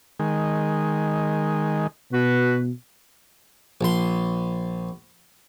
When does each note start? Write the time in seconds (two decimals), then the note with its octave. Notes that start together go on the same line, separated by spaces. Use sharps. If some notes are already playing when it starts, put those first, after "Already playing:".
0.19 D#3 G#3
2.12 B2 F#4 B4
3.81 A#1 C6